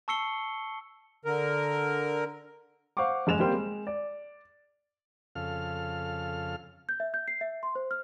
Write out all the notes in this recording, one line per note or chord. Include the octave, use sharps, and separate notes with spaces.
A5 C#6 E6 C7 C#7 G7
D3 A#4
C5 F5 F#5 C#6 D6
F#1 G#3 E7 F7
G3 A#3 C4 G5 C6
G#3
D5
F2 C#3 A4 F5 F6
G6
E5
G6
C7
E5
C6
C5
F6